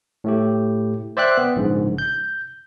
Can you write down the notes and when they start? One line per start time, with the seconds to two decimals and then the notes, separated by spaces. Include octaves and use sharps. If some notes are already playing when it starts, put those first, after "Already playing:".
0.24 A2 A3 G4
1.17 C5 D5 E5 G5 F#6
1.38 B3
1.56 A#1 G#2 C#3
1.98 G6